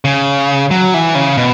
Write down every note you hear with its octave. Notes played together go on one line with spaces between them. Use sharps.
C#3
F#3
E3
C#3
B2